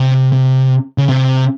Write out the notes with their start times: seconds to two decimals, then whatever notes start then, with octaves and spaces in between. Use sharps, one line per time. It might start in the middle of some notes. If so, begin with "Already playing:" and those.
Already playing: C3
0.32 C3
0.98 C#3
1.09 C3